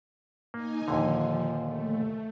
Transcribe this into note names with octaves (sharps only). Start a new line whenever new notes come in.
A#3 D#4 G#5
D#2 A#2 D3 F3
A3